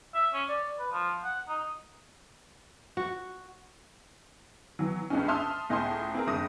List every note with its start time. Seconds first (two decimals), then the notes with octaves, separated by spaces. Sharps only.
0.14 E5
0.34 C#4
0.49 D5
0.79 B4
0.92 F3
1.24 F#5
1.48 D#4
2.97 F#4
4.79 E3 F#3
5.10 C#2 G2 D3 G#3 C4 C#4
5.28 E5 A5 C6 D#6 F6
5.70 C#2 A2 D#5 G#5 A5 C6
6.15 C4 G#4 A#4
6.27 F#1 D2 D3 D#6 A#6